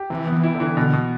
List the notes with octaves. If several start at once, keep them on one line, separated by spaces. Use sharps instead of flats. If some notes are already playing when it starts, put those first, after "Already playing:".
Already playing: G4
C3 E3
E3 B3
E4
D3
E3
B2 D3
B2